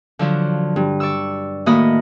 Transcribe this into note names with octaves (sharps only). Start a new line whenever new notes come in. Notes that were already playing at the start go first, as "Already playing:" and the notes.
D3 F3 F#3
G2
D5 C#6 E6
A2 D#3 A#3 F#4 D#5 B5